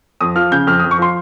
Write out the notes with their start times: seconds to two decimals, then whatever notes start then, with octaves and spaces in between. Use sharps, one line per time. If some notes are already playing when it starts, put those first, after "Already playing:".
0.21 F2 D#6
0.35 F3 F6
0.52 C#3 G6
0.67 F2 F6
0.79 D#6
0.84 F2
0.91 C#6
0.98 F3 C6